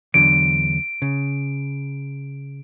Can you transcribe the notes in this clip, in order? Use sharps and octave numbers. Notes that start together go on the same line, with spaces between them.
E2 D3 F#3 D7
C#3